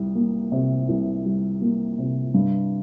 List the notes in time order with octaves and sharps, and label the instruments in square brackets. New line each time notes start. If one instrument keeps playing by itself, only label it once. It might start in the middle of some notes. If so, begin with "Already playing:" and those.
Already playing: [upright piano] C2 G3
A#3
C3
C2
G3
A#3
C3
G2